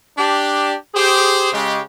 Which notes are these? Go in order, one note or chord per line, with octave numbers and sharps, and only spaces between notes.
D4 G4
G4 G#4 C5
C#3 G#3 G4